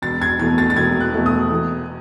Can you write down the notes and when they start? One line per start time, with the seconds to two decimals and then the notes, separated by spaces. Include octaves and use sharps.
0.02 E1 A6
0.22 G#6
0.39 E2 B2 A3 G#6
0.58 A6
0.70 A6
0.76 E1 G#6
1.00 F#6
1.13 E2 B2 A3
1.26 D#6
1.50 E2